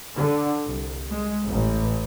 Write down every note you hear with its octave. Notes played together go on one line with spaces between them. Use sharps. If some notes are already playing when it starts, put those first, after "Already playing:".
D3
C2
G#3
A1